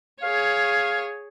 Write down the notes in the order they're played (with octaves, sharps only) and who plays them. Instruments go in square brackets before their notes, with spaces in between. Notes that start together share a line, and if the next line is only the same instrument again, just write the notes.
[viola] G#4 C#5 [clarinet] F5